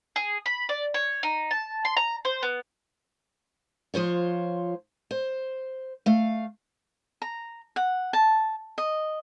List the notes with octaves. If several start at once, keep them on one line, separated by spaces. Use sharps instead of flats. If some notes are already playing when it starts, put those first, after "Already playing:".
G#4
B5
D5
C#5
D#4
A5
C6
A#5
C5
B3
F3 F4 C5 C#5
C5
A3 F5
A#5
F#5
A5
D#5